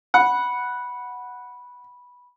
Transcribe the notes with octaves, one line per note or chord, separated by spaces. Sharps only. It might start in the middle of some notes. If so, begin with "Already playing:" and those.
F#5 B5